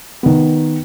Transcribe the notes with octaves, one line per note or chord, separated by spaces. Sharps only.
D#3 B3